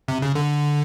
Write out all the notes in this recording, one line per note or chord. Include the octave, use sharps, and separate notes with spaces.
C3
C#3
D3